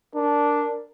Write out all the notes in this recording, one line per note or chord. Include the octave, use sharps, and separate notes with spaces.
D4 A#4